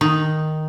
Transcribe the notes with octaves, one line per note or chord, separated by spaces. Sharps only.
D#3